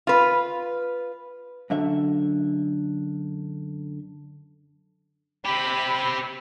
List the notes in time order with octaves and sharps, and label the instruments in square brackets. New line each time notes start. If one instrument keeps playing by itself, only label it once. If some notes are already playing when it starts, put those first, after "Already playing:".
[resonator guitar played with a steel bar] F4 B4
[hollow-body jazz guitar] F#2 D3 E5
[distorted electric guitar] C4 G4 [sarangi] B5